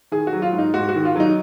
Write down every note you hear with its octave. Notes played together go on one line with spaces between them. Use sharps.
D#3 G#4
F#4
F#3
F4
G#2
D#4
G#2 F#4
F#4
D#3
F4
F#3 D#4